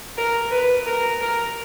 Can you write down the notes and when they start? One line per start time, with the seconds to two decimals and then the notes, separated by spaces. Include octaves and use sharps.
0.18 A#4
0.51 B4
0.86 A#4
1.21 A#4